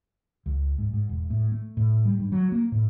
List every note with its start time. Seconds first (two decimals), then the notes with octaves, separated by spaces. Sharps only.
0.46 C#2
0.78 G#2
0.93 G#2
1.09 E1
1.30 A2
1.52 A3
1.77 A2
2.05 G3
2.19 G2
2.32 F#3
2.52 A#3
2.72 A2